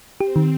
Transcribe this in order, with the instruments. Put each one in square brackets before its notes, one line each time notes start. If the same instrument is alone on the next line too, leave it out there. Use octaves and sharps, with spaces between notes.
[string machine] C4 [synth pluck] G4
[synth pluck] D#3